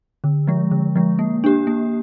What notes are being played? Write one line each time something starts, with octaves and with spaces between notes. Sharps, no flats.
D3
F3 G#3
D3
F3 G#3
A#3
D4 G4
A#3